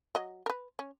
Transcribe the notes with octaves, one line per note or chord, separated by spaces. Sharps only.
F#3 D#5
A#4 B4
C#4